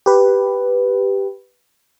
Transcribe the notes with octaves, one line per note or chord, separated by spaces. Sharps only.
G4 B4